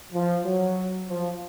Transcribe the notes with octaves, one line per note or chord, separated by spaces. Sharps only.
F3
F#3
F3